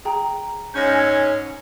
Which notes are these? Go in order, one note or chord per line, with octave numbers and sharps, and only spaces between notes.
G#4 G5 A#5
G#2 C#4 G6 A#6
G#5 E6 G#6